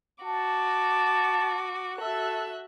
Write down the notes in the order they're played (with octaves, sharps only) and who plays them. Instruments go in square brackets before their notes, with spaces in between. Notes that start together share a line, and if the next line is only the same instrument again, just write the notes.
[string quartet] F#4 D6 [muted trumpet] A5
[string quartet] F#4 E5 F#6 [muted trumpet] A4